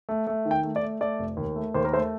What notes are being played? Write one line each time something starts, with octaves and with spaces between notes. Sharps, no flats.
A3
A3
D#3
G5
A3
D5
A3
A3 D5
F1
D#2
A3
D#2 C5
A#4
A3 C5